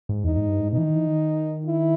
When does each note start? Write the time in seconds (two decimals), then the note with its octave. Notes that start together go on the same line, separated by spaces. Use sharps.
0.09 G#2
0.24 E2 D#4
0.37 G#2
0.49 G2
0.60 G#2
0.72 B2 D#4
0.78 E3
0.84 D#3
0.95 E3
1.07 D#3
1.66 E4